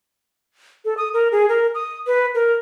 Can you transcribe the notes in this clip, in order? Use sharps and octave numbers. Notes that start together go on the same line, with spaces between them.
A4
D#6
A#4
G#4
A#4
D#6
B4
A#4